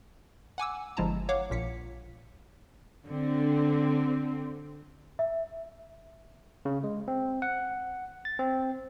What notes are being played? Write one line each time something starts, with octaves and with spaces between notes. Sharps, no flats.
F#5 G#5 D6 E6
G1 F3 G#3 E4 A5 A#5
C#5 F5 F#5 D6
A#1 A#2 B6 C#7
D3 C4
E5
C#3
G#3
C4
F#5
A6
C4